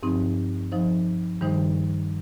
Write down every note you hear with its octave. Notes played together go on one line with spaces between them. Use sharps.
G2 F3 C4 D#4
F3 D#4 C5 D#5
G2 D#3 G3 D#4 C5